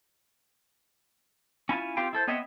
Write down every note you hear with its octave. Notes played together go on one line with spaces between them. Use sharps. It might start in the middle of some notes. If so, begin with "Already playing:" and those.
C#4 E4 F4 G#5
C4 F4 G4 F5 G5
E4 A4 C5
B3 C4 C#5 D#5 E5